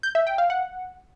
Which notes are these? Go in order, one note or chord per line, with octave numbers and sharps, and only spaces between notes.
G6
E5
G5
F5
F#5